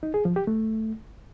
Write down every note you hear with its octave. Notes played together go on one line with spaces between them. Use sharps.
D#4
G#4
F3
G4
A3